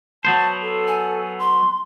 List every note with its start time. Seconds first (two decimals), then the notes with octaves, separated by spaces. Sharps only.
0.25 F#3 B3 C5 A5
0.62 A4
0.87 G#5
1.39 C6